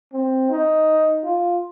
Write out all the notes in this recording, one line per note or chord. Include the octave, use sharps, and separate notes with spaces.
C4
D#4
F4